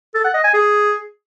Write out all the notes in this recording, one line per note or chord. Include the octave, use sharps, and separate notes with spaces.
A4
F#5
D#5
G#5
G#4